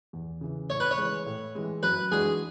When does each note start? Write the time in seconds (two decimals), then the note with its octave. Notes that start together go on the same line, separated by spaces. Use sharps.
0.13 E2
0.41 C#3 E3
0.70 A2 C#5
0.80 B4
0.91 C#5
0.98 E3 G#3
1.26 A2
1.55 E3 G#3
1.83 F#2 B4
2.11 E3 G#3 D4 F#4 G#4